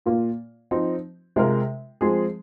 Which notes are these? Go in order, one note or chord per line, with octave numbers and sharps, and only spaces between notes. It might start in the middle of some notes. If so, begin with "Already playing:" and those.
A#2 A#3 F4
F3 C4 D#4
C3 G#3 F4 A#4
F3 G#3 C4 G#4